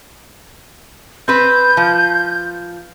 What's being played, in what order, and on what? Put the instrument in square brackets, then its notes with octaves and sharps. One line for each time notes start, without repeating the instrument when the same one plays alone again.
[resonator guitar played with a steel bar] C4 B4 [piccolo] G6
[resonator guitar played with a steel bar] F3